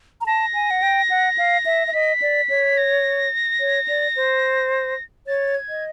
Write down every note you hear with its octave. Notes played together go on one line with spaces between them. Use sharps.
A#5
A5 A#6
G#5
F#5
G5
F#5
F5
E5
E5
D#5 B6
D5
C#5
A#6
C#5
D5
C5
C#5 A6
G#6
D#5